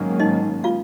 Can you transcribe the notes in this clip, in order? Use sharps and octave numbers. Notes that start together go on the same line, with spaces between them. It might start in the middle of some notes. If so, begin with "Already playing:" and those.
Already playing: G#2 D#3 F#3 A#3 C#4
D#4 D#5
F4 F5